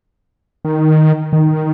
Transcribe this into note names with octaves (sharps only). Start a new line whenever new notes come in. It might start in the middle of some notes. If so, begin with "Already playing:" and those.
D#3
D#3